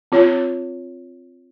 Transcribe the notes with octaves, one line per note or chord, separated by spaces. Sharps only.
C4 F4 C#5